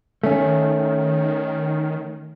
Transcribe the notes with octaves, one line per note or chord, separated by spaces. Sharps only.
D#3 A3 C#4